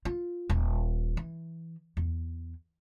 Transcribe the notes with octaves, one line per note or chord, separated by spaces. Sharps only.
F4
D#1
E3
E2